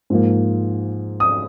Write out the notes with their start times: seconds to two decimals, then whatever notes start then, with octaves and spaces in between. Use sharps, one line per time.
0.10 G#2 F3 A#3
1.20 D#6